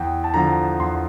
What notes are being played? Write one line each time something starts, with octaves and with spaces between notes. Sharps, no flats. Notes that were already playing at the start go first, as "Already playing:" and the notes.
Already playing: E2 G5
A5
D3 F3 A#5
E2 C6